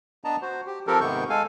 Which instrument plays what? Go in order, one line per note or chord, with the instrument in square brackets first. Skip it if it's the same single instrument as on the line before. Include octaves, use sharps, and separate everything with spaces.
[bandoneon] B3 D4 D#5 A5 A#5
F#4 C5
G4
F3 C4 G4 A4 A#4
G#2 C3 D#3 B3 C#6 G6
G#3 A4 F5 G#5